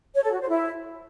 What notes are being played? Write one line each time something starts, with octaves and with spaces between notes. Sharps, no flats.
C#5
A4
F#4
C5
E4